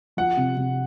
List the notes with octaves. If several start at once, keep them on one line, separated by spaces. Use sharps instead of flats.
F3 F#5
C3
C3